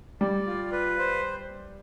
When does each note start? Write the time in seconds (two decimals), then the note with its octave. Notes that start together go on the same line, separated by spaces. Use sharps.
0.21 G3 D5
0.47 F4
0.72 B4
0.98 C5